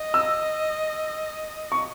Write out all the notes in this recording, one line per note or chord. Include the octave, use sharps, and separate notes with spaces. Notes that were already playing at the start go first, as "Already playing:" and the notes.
Already playing: D#5
E6
C#6